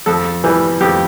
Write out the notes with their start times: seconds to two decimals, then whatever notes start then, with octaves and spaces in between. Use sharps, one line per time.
0.06 F2 A4
0.44 E3 G3
0.81 F2 G4